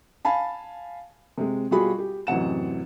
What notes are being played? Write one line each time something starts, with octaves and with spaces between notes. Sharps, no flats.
F5 G#5 A5 B5
C3 G#3
B2 G3 F4 F#4 G#4 B5
G4
A1 F#2 C3 F#5 E7